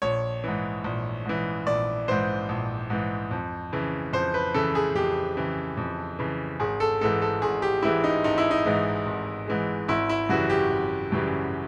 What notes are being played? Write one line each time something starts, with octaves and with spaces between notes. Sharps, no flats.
A#1 C#5
G#2 E3
A#1
G#2 E3
A#1 D5
G#2 E3 C5
A#1
G#2 E3
F2
C#3 E3
F2 C5
B4
C#3 E3 A4
G#4
F2 G4
C#3 E3
F2
C#3 E3
G#1 G#4
A4
G#2 E3 G#3 A4
A4
G#1 G#4
G4
G#2 E3 G#3 E4
D#4
G#1 D#4
E4
D#4
G#2 E3 G#3
G#1
G#2 E3 G#3
G#1 E4
E4
F#2 C#3 E3 G3 F#4
G4
G#1
F#2 C#3 E3 G3